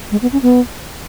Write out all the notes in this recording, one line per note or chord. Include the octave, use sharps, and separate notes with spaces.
G#3
B3
C#4
B3